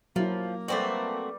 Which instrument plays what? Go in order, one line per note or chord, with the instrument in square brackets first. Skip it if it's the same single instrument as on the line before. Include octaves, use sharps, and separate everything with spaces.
[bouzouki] F3 [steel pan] F#3 E4 [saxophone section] A#3
[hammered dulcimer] G3 B4 D5 [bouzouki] A3 C4 F#4